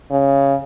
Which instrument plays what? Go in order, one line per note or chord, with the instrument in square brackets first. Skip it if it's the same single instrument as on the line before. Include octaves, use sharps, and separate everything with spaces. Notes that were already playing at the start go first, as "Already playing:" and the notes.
[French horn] C#3